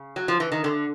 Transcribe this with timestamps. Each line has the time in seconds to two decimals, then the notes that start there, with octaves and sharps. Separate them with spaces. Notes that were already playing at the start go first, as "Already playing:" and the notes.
Already playing: C#3
0.16 F#3
0.28 F3
0.40 E3
0.52 D#3
0.64 D3